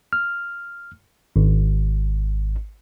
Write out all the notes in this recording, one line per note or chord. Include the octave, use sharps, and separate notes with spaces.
F6
G#1